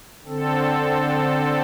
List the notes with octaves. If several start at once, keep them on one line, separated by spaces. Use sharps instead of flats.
D3 C4 A4